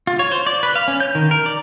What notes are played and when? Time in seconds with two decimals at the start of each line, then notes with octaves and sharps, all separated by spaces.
0.07 F4
0.19 C#5
0.32 C5
0.47 D5
0.63 B4
0.75 F5
0.88 C#4
1.00 G6
1.15 D#3
1.31 A#4
1.46 D5